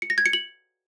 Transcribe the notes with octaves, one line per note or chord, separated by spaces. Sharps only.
C#7
A#6
G#6
C#7
F#7